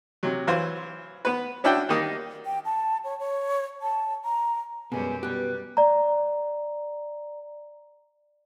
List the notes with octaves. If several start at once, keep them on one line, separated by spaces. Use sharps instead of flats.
C3 F#3
E3 F#3 F4 C5
B3 B4
C#4 D4 E4 F#4 G5
D#3 G3 A#3 D#4 D#6
G5
A5
C#5
C#5
A5
A#5
F#2 B2 G3 G#3 G4 B4 G#5
B2 G3 G4 F#6
D5 A#5